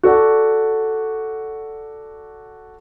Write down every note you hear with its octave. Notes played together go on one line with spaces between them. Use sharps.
F#4 A4 D5 F#5